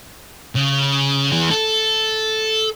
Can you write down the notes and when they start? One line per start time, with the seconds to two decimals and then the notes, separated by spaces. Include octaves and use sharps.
0.56 C#3
1.32 E3 G#4
1.51 A4